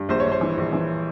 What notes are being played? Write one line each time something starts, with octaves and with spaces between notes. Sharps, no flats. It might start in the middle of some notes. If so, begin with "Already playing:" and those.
Already playing: G2
A#1 C5
C#5
A#1
C5
E3
A#1
E3